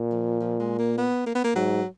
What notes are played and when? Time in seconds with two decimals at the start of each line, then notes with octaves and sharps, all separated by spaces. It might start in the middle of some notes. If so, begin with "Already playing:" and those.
Already playing: A#2
0.12 F3
0.40 F3
0.60 G#3
0.79 A#3
0.98 B3
1.27 A#3
1.35 B3
1.44 A#3
1.55 G#2 F#3